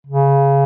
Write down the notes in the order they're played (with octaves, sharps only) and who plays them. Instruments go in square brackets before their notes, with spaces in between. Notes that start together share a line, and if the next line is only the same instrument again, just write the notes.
[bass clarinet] C#3